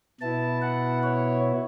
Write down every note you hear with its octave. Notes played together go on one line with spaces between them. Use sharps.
B2 B3 E4 A5
F#5
C#5